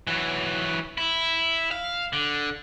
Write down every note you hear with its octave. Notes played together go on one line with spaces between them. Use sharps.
E3 F#3
E4
F5
D3